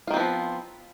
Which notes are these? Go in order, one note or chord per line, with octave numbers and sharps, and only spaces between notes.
D#3 F3 B3 C4 F4